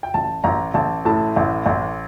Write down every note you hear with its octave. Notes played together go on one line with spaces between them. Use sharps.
G5
A1 A5
A1 A#5
A1 A5
A2 A5
A1
A1